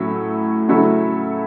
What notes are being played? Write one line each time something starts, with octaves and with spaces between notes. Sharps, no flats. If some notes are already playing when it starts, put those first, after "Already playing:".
Already playing: A2 F#3 C#4 E4
C#3 F#3 A3 C#4 E4